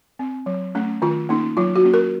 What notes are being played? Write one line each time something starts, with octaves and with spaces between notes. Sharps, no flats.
C4
F#3
A3 C#4
D#3 F4
A#3 C#4 D#4
F#3 F4
F#4
A#3 C#4
A#4